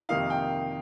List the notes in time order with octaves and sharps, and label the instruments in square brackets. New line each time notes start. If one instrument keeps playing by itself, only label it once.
[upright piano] F2 C3 D#3 A#3 D#4 [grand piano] F5
[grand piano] G5